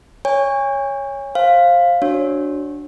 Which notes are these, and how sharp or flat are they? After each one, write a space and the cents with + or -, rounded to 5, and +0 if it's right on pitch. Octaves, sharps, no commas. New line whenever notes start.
C#5 +0 G#5 -35
C5 +20 F5 +0
D4 +0 F#4 +0 C#5 -25